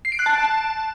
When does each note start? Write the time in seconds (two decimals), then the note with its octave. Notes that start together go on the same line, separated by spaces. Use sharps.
0.05 C7
0.12 D7
0.19 F#6
0.26 A5